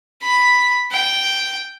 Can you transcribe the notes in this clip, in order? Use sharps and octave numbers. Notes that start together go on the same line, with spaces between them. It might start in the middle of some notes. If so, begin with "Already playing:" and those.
B5
G5